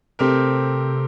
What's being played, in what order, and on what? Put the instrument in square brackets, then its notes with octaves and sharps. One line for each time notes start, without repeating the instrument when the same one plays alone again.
[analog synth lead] C3 [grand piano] A3 C4 G4 A#4